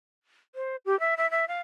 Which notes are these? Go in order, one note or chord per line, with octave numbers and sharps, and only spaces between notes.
C5
G4
E5
E5
E5
F5